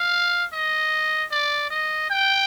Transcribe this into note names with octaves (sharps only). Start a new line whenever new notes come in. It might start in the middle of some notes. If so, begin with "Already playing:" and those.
Already playing: F5
D#5
D5
D#5
G5